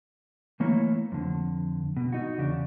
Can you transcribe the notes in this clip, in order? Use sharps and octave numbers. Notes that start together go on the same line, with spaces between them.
E3 A3 A#3 E4 C#5
F2 D3
B2
D#4 F#4
E2 C#3 D4